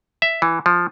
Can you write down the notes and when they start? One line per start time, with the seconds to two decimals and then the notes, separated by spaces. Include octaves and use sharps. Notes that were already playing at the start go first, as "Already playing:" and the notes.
0.22 E5
0.42 E3
0.66 F3